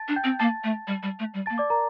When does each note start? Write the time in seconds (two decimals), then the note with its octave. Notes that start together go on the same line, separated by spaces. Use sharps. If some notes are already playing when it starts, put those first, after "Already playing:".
Already playing: A5 A6
0.08 D4
0.16 G5 G6
0.24 C4
0.39 A#3 A5 A6
0.64 A3
0.87 G3
1.03 G3
1.19 A3
1.34 G3
1.46 A5 A6
1.50 A#3
1.58 D5 D6
1.70 A#4 A#5